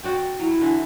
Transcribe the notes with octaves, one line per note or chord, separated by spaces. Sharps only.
F#4 D5 G5
F#3 E4
D3 E3